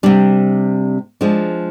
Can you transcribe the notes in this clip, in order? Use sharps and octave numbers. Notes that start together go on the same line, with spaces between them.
C3 G3 D4
F3 G#3 D4